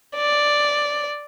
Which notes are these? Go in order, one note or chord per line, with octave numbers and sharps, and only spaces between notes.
D5